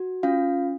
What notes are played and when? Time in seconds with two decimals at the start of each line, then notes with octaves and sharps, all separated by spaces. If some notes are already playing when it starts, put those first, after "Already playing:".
Already playing: F#4
0.23 C#4 F4 F5